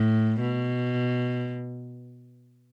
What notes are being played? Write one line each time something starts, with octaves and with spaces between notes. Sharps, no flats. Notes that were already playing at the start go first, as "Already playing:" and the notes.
Already playing: A2
B2